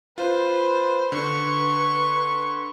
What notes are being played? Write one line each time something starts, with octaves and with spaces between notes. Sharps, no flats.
F4 B4 C5
D3 B4 C6 C#6